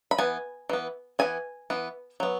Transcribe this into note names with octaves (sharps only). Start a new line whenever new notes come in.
B5
E3 B3 G#5
E3 B3
E3 B3 G#5
E3 B3
F#3 B3